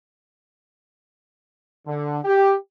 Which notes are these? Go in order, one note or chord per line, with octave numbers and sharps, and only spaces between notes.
D3
G4